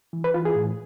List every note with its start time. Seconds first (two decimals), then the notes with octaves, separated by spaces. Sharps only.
0.13 E3
0.24 B4
0.34 E3 F4
0.45 G#4
0.55 A2